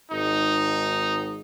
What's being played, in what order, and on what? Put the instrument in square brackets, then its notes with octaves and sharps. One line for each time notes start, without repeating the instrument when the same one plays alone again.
[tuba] G#1 [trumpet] D#4